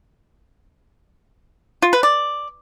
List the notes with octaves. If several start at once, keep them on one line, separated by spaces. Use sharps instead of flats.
F4
B4
D5